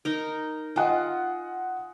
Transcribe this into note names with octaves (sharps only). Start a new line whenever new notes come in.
D#4 A#4
F4 D#5 F#5 G#5